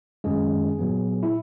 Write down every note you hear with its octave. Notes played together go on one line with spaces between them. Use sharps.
F#2 D#3 G#3 C#4 G#4
A#2 F#3 B3
E4